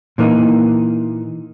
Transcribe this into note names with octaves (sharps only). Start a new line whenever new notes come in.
A#2 E3 A#3 D#4